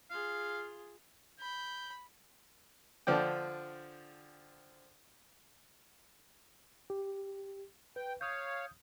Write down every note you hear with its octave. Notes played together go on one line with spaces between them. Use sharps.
F4 G#4 F5
B5 G6
D3 F3 D5 G5
G4
B4 G5
C#5 F5 D#6 G6